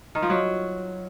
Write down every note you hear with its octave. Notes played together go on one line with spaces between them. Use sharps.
D#3
F3
F#3